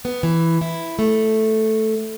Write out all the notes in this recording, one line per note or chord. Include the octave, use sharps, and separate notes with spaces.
B3
E3
E4
A3